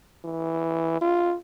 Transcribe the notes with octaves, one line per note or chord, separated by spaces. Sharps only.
E3
F4